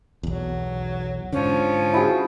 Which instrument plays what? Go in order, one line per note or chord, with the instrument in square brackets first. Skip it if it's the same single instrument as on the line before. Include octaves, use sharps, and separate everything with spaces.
[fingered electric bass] B1 E2 [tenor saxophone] F#3
[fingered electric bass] G#2 D3 [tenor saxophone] F3 [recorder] C#4
[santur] E4 F#4 G#4